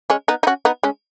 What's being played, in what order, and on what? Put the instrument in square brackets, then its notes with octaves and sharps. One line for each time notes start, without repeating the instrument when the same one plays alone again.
[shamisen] G#3 C#4
B3 D#4
D#4
C#4 F#4
B3 D#4
G#3 C#4